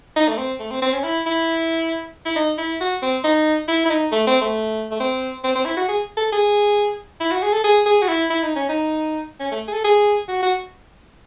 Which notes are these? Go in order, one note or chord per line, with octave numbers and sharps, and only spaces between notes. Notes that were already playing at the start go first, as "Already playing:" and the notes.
D#4
A3
C4
A3
C4
C4
C#4
E4
E4
E4
D#4
E4
F#4
C4
D#4
E4
E4
D#4
A3
C4
A3
A3
C4
C4
C4
E4
F#4
G#4
A4
G#4
E4
F#4
G#4
A4
G#4
G#4
F#4
E4
E4
D#4
C#4
D#4
C#4
A3
G#4
A4
G#4
F#4
F#4